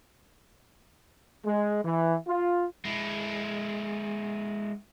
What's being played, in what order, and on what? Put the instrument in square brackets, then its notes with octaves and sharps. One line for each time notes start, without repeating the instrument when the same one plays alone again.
[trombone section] G#3
E3
F4
[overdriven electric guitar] G#3 E4